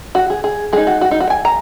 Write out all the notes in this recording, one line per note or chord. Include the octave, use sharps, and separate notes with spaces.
F#4
G#4
G#4
G#3 D#4 G#4
F#4
F#4
D#4
F#4
G#5
A#5